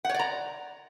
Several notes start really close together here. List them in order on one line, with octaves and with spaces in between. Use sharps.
F#5 C#5 D5 A#5